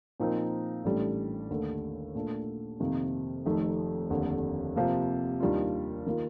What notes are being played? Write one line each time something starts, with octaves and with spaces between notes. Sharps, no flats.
A#2 F3 C4 D#4 A#4
A1 A2 G3 D4
D#2 D3 A3
A#2 A3 D4 A4
F2 C3 D#3 A#3
F1 F2 D#3 A3 D#4
F1 D#2 D3
C3 F3 A#3
D#2 D#3 G3 D4 F4
D#3 A#3 F4 A#4